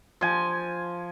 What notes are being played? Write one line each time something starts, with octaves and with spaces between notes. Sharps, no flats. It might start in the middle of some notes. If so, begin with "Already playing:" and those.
F3 G#5